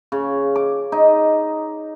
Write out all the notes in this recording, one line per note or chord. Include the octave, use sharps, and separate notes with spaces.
C#3
D6
D#4